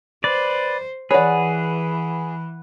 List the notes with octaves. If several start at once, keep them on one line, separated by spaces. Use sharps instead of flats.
B4 C5 D5
E3 G#4 B4 C#5 D5 F#5